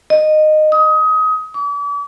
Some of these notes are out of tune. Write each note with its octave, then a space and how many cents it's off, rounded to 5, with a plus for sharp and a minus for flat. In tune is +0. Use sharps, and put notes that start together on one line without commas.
D#5 -15
D#6 +25
D6 -40